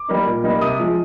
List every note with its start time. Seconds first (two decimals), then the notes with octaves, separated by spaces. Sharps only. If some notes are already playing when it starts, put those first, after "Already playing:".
Already playing: D6
0.08 G3 A#3 D#4
0.26 A#2
0.44 G3 A#3 D#4
0.61 C3 D#6
0.80 F3 G#3